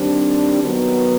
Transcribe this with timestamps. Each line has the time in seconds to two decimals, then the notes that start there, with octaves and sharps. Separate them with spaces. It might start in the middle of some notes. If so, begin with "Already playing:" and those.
Already playing: D#3 G3 C4 D4
0.61 D#3 F#3 B3